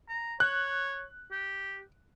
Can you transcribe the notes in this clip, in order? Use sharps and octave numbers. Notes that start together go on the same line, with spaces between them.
A#5
C#5 F#6
G4